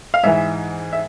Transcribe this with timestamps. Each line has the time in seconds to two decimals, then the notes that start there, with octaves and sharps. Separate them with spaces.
0.14 F5
0.23 G#2 E3 E5
0.93 E5